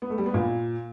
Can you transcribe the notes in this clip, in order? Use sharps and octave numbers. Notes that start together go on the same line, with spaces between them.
B3
A3
G3
B3
A#2